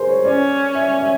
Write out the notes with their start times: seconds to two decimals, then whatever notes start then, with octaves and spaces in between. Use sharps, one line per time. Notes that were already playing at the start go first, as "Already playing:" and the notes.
Already playing: G#4 A#4 C5
0.09 C#5
0.25 C#4 D5
0.75 E5
1.01 E5